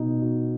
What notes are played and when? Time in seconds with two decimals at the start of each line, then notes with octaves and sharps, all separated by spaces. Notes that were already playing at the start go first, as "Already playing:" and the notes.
Already playing: B2 D#4 F#4
0.22 F#4